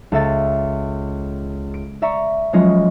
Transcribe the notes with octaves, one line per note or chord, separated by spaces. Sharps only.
C#2 A4 E5 A6
D7
D5 E5 A#5 C#6 B6 C#7
F3 F#3 G#3 C#4 F4 D#5